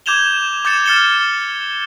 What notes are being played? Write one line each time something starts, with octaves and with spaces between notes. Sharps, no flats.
D6 G6 G#6 E7 F7 G7
D6 G6 A6 C#7 E7
F6 A6 C#7 E7 G7